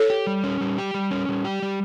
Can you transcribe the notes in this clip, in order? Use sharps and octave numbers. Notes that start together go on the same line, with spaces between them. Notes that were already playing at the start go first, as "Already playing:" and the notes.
Already playing: A4 C#5
G4
G3
C#4
G3
G4
G3
C#4
G3
G4
G3